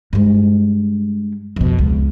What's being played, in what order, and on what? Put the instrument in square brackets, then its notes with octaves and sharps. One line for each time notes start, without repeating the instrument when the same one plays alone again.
[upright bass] G2 G#3
F2 B2
C#2